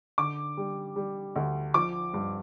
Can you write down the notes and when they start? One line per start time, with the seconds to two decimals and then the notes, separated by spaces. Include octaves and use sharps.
0.18 D3 D6
0.57 G3
0.96 G3
1.36 D2
1.74 F3 D6
2.14 G2